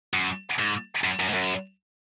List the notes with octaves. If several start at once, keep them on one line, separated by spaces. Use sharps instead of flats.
F#2
G#2
F#2
F#2
G#2
F#2